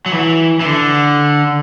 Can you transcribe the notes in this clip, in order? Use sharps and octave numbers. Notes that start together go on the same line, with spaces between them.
F#3
E3
E3
D3